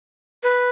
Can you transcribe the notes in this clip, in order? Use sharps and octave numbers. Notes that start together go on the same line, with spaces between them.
B4